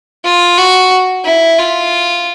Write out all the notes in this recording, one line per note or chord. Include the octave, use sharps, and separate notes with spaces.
F4
F#4
E4
F4